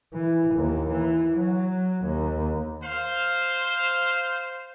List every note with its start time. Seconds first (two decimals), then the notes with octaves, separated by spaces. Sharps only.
0.14 E3
0.55 D#2
0.92 E3
1.37 F#3
2.04 D#2
2.83 C5 F5